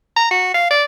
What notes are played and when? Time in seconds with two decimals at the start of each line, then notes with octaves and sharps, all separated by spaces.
0.16 A#5
0.31 F#4
0.54 F5
0.71 D5